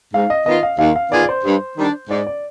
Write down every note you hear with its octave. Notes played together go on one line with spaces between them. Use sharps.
G#2 F5
D#5
D#3 B3 F4 D#5
F5
D#2 F5
F5
D#3 B3 F4 G#4 D5
D5
C5
G2
D#3 G3 D4
G#2 D5
D5